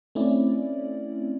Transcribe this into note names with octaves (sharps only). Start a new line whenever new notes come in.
A3 C4 C#4 E4 D5